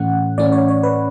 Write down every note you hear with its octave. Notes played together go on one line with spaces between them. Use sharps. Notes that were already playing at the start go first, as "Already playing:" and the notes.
Already playing: A2 E3 A3 C#4 F#5
A2 E3 A3 C#4 D5
C#5
C#5
B4